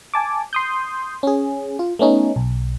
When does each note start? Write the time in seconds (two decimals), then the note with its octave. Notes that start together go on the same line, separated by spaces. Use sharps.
0.14 G#5 A5 D6
0.53 C6 D#6 G6
1.23 C#4 G#4
1.79 F4
1.99 A3 B3 C#4 D#4
2.36 B1